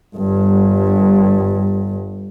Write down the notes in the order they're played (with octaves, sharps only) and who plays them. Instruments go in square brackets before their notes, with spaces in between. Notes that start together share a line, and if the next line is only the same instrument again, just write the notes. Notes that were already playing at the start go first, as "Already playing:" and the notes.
[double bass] G1 G2